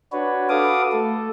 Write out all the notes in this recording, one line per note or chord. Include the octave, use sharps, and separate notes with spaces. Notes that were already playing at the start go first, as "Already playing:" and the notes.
D4 F#4 B4 C#5
F#4 A4 B4 F5 D6 D#6
A3 A4